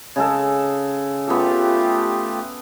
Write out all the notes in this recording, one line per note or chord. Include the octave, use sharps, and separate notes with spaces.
C#3 G#3 A4
A3 B3 F4 G4 A4